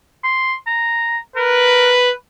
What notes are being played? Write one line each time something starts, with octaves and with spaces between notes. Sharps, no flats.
C6
A#5
A#4 B4